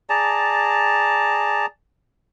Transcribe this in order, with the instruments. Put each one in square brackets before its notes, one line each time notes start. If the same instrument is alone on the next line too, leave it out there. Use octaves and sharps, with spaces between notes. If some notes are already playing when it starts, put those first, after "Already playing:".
[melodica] G#4 D5 A5 A#5